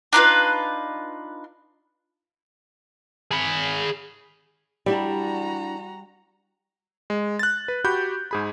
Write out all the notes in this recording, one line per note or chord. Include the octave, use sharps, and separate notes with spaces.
D4 D#4 F4 B4
G#4 B5
G3 D4 E4 F#4 D5 A#5
G#3
F#6 A6
B4
F#4 G4 B5 G6
G#2 G#4 B5